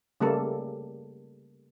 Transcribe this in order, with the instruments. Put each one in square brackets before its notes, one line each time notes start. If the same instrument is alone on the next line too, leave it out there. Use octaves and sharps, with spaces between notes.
[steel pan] C#3 G3 A3 A#3 A4